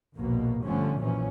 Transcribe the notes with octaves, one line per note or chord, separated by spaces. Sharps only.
A#1 D#2 B2 A#3
G1 D3 F3 G3 A3 C#4
B1 F#2 A#2 E3 F3 C#4